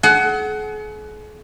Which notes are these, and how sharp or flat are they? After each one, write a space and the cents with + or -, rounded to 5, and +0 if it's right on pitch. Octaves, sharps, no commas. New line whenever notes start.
G#4 +45 F#5 +15